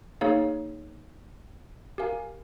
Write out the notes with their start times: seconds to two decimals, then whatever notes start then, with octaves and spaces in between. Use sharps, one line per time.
0.21 A#3 D#4 G#4 C#5 F5
1.98 G4 A#4 F5 G#5